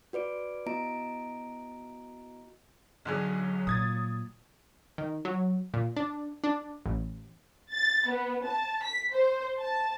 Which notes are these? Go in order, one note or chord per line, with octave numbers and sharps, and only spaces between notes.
F#4 B4 D5 D7
B3 E4 F#4 D#5 A#5 D7
B1 D3 F#3 G#4
A#2 D#6 G#6 A6
D#3
F#3
A#2
D4
D4
A1
A6
B3
A5
B6
C5
A5